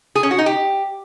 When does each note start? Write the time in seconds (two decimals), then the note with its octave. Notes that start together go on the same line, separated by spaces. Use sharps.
0.15 G#4
0.23 C#4
0.31 F#4
0.38 D#4
0.46 G4